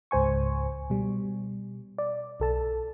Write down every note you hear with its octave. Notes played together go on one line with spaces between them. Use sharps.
C#2 G#2 C5 G#5 C#6
B2 G3
D5
B1 A4 A5